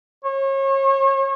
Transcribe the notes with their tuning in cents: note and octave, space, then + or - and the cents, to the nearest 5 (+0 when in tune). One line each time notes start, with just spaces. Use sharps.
C#5 -35